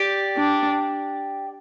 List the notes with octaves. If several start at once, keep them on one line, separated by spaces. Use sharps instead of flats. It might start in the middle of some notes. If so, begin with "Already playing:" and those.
Already playing: G4 D5 G5
D4